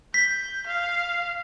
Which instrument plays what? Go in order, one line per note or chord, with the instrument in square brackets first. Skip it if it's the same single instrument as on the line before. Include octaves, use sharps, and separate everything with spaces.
[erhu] G6 [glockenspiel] B6
[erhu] F5